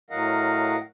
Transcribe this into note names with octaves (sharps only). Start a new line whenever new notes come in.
A2 F#3 A#4 D#5 F5 F#5